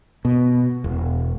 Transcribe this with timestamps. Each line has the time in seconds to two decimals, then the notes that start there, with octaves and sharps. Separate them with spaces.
0.25 B2
0.84 E1